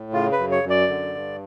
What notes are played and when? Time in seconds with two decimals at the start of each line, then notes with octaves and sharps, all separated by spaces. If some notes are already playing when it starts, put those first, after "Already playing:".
Already playing: A2
0.13 C#3 F4
0.32 B4
0.39 F#2
0.51 C#5
0.64 F#2
0.70 D5
0.89 D3
1.15 G2